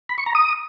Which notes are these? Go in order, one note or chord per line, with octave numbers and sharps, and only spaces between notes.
B5
C#6
A#5
D#6